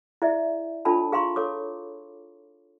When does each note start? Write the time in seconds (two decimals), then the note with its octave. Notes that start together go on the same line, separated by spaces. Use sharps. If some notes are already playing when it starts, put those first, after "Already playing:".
0.22 E4 G#4 D5 E5
0.85 D4 F4 A4 C#5 A5 B5
1.12 G#4 F5 A#5 C6 C#6
1.36 A4 C#5 D6